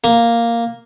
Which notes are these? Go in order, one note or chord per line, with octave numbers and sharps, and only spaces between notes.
A#3